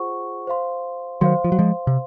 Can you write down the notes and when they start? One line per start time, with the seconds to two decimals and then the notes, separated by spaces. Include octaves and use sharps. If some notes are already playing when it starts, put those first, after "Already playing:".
Already playing: F4 G#4 C5 F#5 C#6
0.47 C5 F5 C6
1.21 D#3 F#3 C5 F5 C6
1.44 F3
1.52 F#3
1.59 F3 G#3
1.87 C3